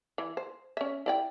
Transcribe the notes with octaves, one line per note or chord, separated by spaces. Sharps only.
E3
C5
C#4 E5
E4 D5 G5